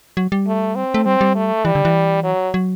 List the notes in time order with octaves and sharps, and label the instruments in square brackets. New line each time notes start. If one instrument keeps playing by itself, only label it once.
[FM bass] F#3
G3
[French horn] A3
C4
[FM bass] A3
[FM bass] G3 [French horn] C4
[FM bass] G3
[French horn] A3
[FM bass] E3 [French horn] G3
[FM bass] D3
E3
[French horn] F#3
[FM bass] F#3